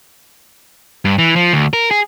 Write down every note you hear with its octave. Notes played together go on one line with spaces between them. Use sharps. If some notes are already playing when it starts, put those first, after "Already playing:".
G2
E3
F3
D2
A#4
G#4